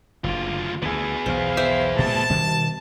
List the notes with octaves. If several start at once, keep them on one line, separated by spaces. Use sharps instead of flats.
F#1 D2 D3 F4
D2 D3 B3 G#4
B1 E2 C5 F5
C5 E5 G5
A#2 G#3 A#3 A5
B2 D#3 G3